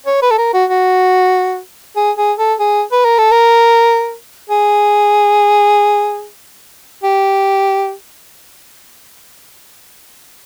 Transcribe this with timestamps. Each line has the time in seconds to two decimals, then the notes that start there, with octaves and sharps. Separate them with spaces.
0.07 C#5
0.22 B4
0.31 A4
0.38 A#4
0.54 F#4
0.70 F#4
1.96 G#4
2.18 G#4
2.39 A4
2.60 G#4
2.92 B4
3.05 A#4
3.18 A4
3.31 A#4
4.50 G#4
7.04 G4